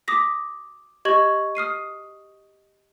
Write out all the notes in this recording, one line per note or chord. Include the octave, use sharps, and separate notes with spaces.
D6 D#6 A#6 B6
G4 D#5 C#6 G#6 F#7
D#6 F6 C7 D#7